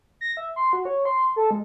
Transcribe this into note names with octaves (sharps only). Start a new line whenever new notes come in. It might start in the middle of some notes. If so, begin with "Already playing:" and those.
A#6
E5
C6
F#4
C#5
C6
A4
G#3